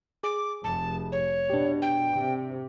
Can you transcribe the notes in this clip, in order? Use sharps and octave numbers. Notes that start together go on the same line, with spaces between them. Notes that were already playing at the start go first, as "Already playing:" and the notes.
G#4 D6
F1 A5
C#5
B2 D4 G4
G5
C3